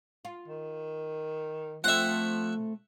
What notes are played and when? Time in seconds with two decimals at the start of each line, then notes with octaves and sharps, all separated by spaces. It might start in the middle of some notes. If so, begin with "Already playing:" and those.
0.25 F4
0.48 D#3
1.84 F3 A3 C4 F4 E5 F#5